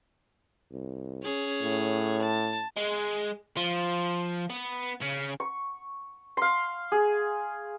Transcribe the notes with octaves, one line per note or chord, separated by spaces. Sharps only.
C2
C#4 G#4
A2
A5
G#3
F3
B3
C#3
C#6
F5 C6
G#4